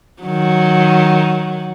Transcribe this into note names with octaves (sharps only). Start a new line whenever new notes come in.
D#3 F#3